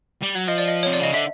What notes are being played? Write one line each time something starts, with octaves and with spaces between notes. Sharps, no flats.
G3
F#3
F3 D#5
D5
D#5
C3 C#5
D5
C#3 D#5
D3 E5